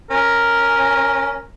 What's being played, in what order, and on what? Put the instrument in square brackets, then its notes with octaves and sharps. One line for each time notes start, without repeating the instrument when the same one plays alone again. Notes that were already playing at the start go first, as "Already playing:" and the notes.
[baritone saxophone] C#4 [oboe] A#4